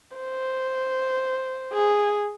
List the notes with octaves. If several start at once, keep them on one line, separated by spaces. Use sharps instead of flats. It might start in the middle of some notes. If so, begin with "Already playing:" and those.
C5
G#4